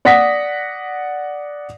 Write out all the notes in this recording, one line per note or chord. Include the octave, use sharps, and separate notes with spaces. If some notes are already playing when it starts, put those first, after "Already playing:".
D5 F#5 D#6 A#6 B6